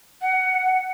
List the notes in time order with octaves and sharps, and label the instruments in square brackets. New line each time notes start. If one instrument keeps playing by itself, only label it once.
[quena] F#5